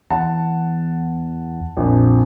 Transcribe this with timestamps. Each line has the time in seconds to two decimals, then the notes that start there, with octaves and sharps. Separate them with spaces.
0.10 E2 F#5 A5
1.77 A#1 F2